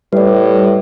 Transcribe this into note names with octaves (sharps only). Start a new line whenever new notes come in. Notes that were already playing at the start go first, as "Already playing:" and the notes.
A2 G3 B4 D5